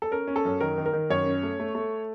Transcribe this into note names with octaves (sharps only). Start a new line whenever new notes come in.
A4
C#4 A#4
C#4
A4
F#2
D#3 A#4
D#3
A#4
D#3
F#2 C#5
C#4
A3
A3
A3